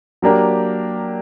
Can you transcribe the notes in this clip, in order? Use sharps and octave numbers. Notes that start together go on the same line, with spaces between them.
F#3 A#3 D4 G4 A#4